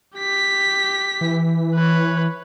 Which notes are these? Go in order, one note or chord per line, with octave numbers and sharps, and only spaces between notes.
G4 B6
E3
B4 C#5